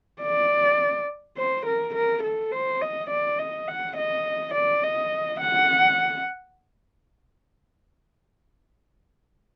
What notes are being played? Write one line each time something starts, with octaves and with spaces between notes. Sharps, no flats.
D5
C5
A#4
A#4
A4
C5
D#5
D5
D#5
F#5
D#5
D5
D#5
F#5